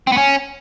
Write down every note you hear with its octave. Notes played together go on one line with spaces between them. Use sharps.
C4
B3
C#4